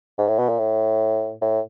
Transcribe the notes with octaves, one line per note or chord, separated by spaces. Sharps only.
G#2
A2
B2
A#2
A2
A2